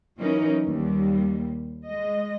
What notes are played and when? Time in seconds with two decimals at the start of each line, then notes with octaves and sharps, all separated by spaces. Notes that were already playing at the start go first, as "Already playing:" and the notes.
0.17 E3 F#3 C#4 D#4 A#4
0.66 D#2 G3
1.86 G#3 D#5